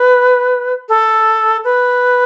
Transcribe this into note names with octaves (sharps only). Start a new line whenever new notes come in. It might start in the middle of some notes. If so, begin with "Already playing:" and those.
Already playing: B4
A4
B4